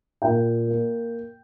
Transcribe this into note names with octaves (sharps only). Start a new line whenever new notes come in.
A#2 G5
A#3